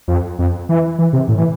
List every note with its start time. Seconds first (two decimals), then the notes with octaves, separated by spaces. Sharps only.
0.08 F2
0.39 F2
0.69 E3
0.99 E3
1.13 C3
1.28 A2
1.38 E3